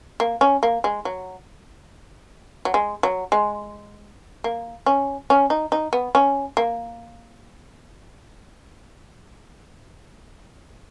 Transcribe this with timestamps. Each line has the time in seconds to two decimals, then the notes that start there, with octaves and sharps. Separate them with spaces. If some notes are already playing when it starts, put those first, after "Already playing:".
0.20 A#3
0.41 C#4
0.63 A#3
0.84 G#3
1.05 F#3
2.65 F#3
2.74 G#3
3.03 F#3
3.32 G#3
4.44 A#3
4.86 C#4
5.30 C#4
5.50 D#4
5.72 D#4
5.93 B3
6.15 C#4
6.57 A#3